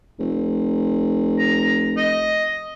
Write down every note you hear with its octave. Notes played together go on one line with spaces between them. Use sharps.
F1
A#5
D#5